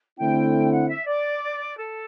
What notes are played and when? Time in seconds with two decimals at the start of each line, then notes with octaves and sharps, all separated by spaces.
0.19 D3 A3 C4 E4 G5
0.72 F#5
0.89 E5
1.06 D5
1.76 A4